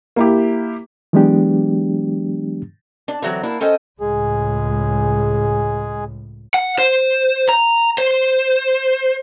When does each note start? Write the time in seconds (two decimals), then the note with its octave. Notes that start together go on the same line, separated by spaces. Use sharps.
0.16 A#3 E4 G4
1.13 E3 F#3 G#3 B3 D4 G4
3.08 D4
3.22 D3 E3 F#3 C4
3.43 A#3 D4 E4
3.61 C#4 A4 C5 D#5 G5
4.01 C#2 A2 G#3 G#4
6.54 F#5
6.78 C5
7.49 A#5
7.98 C5